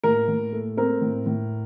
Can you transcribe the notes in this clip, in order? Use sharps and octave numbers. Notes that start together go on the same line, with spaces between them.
A2 A#4
A2
A3
C4 A#4
A2
A2